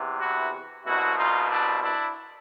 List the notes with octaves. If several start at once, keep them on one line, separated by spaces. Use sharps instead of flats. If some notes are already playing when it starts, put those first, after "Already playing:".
Already playing: E2 C3 E3
E4 F#4
C2 B2 E4 F#4
D#4 F4
D4 E4
D4 E4